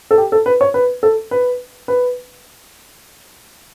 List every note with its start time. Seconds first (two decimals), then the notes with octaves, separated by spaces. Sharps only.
0.11 A4
0.18 G4
0.32 A4
0.46 B4
0.61 C#5
0.74 B4
1.03 A4
1.31 B4
1.88 B4